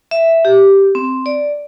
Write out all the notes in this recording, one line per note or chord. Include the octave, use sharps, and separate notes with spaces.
E5
G4
C4
D5